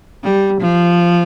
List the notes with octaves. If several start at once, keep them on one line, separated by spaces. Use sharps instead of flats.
G3
F3